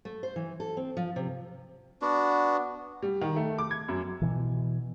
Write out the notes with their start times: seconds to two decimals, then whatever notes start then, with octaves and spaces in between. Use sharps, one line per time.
0.05 A3
0.23 C5
0.36 E3
0.60 A4
0.77 C4
0.97 F3
1.16 C3
2.02 B3 D4 F#4
3.02 G3
3.21 D#3
3.36 A3
3.58 D6
3.71 G#6
3.88 F#2
4.22 B2 E3